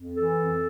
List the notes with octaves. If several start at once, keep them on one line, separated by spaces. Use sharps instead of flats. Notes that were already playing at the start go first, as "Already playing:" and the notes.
Already playing: F2
E3 A4
F2